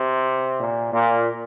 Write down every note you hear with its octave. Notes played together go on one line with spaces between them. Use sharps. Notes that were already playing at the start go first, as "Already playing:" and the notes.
Already playing: C3
A#2
A#2